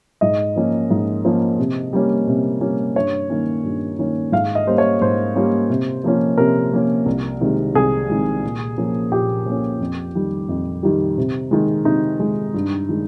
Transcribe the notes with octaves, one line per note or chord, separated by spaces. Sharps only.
G#2 D#5
F3 A#3 C#4
G#2
F3 A#3 C#4
C3
G3 A#3 C#4
C3
G3 A#3 C#4
G2 C#5
D#3 A#3 C#4
G2
D#3 A#3 C#4
G#2 F5
D#5
G3 A#3 C#4 C5
C#5
G#2 C5
G3 A#3 C#4
C3
F3 A#3 C#4
C3 A#4
F3 A#3 C#4
C2
C3 D#3 G#3
C2 G#4
C3 D#3 G#3
A#2
F3 A#3 C#4
A#2 G4
F3 A#3 C#4
F2
D#3 G3
F2
D#3 G3
C3
D#3 G#3
C3 D#4
D#3 G#3
G2
D#3 G#3